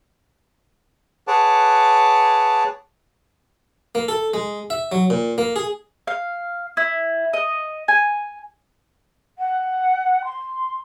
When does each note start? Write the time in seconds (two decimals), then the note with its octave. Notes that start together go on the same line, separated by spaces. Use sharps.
1.28 G#4 B4 C#5 F#5 A5 D6
3.95 A#3
4.08 A4
4.34 G#3
4.70 E5
4.92 F#3
5.10 A#2
5.38 A#3
5.56 G#4
6.07 F5
6.77 E4
7.33 D#5
7.88 G#5
9.39 F#5
10.25 C6